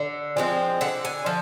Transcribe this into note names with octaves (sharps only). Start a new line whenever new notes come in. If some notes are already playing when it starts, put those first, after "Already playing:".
Already playing: D3
F3 G#3 C4
D3 F#5
G#5
F3